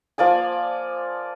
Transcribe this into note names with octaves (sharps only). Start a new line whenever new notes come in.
F3 A#3 D5 G#5